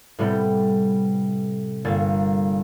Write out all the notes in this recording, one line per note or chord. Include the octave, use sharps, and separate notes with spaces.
A2 C3 G3 B3 G6
G1 A#3 A6